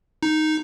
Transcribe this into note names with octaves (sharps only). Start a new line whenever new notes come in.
D#4